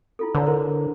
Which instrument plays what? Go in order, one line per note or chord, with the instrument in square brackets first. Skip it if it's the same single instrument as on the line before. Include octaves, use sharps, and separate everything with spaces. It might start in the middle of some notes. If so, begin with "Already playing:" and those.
[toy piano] E4 F4 A4
[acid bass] D3 [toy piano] B4 C#5 A#5
[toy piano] E4 A#4 C5